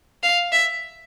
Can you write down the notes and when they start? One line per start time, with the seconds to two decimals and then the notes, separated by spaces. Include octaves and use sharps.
0.23 F5
0.52 E5